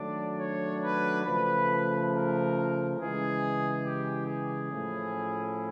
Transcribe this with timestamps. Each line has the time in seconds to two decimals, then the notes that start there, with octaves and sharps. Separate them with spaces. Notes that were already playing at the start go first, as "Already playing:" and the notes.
Already playing: D#3 F#3 A3 D4 D5
0.39 C#5
0.82 B4
1.25 C#3 F3 A3 B4
2.11 A#4
2.97 C#3 E3 G#3 G#4
3.83 G4
4.26 G#4
4.70 A2 F3 A3 C#4 E4